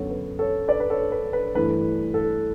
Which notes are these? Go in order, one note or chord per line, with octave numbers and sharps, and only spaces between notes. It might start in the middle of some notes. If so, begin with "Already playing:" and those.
Already playing: F#2 D3 F#3 B3 A4 C#5
B4
A4 C#5
B4 D5
B4
A4 C#5
B4
B4
G2 E3 A3 B4
A4